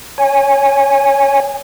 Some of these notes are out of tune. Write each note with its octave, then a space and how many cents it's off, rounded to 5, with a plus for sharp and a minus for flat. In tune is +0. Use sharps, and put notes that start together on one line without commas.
C#5 +0 G#5 -15